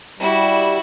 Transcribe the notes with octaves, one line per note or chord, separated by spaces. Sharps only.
G3 E4 F#4